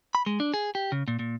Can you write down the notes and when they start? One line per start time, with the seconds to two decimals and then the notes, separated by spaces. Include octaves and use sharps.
0.15 B5
0.26 G#3
0.40 D4
0.54 G#4
0.75 G4
0.92 C#3
1.08 A#2
1.19 A#2